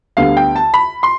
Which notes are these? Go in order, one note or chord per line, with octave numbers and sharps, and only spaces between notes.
D2 D3 G3 B3 F5
G5
A5
B5
C6